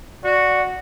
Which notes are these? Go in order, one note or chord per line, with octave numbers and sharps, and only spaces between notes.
F#4 D5